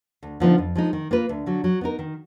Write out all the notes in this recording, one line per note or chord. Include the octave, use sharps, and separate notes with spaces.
D2
D3 F3 B3 D#4
F2
F3 G#3 D#4
D#3
A#3 F4 B4
D2
D3 F#3
F#3
B3 D#4 A#4
D#3